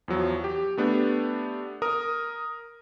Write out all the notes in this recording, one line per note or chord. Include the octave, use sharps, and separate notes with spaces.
E2 F3 F#3
G4
A3 B3 D4 G4
A#4 D#6